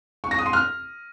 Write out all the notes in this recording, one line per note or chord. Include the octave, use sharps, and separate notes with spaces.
C#6
A#6
D#6
C6
F6